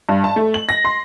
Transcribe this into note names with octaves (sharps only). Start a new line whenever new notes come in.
G2
A5
A3
F#7
A#6
C6